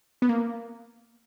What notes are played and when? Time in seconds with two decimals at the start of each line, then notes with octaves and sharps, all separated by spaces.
0.22 B3
0.29 A#3